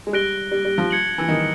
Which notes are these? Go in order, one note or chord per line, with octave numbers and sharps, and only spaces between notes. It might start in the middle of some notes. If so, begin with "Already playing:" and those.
G#3
G3 F#6 A#6 D7 G7
G3
G3
F3
G#6 C#7 F#7
E3
D#3